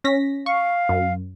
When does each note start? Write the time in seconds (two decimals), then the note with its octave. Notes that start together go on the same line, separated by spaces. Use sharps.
0.04 C#4 A#6 B6
0.46 F5 C#6
0.89 F#2